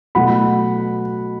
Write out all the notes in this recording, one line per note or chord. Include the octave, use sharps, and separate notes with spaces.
B2 F#3 A3 F#5 B5